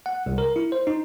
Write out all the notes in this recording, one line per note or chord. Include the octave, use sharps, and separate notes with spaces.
F#5
C2
A#4
E4
C5
D#4